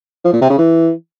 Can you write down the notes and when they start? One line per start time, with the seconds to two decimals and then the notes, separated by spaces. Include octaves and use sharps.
0.25 F3
0.33 A#2
0.42 C3
0.50 C#3
0.58 E3